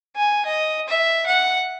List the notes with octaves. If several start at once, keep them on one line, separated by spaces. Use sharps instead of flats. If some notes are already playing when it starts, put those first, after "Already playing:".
G#5
D#5
E5
F#5